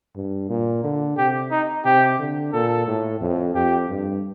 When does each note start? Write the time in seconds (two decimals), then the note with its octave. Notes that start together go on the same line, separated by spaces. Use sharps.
0.16 G2
0.50 A#2
0.84 D3
1.18 C3 G4
1.52 D#4
1.85 C3 G4
2.19 D3
2.53 A#2 A4
2.87 A2
3.21 F2
3.55 F2 G4
3.89 G2